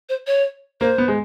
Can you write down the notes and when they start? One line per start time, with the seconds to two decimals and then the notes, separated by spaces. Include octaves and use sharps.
0.09 C5
0.27 C#5
0.81 A#3 C5
0.98 B3
1.08 G#3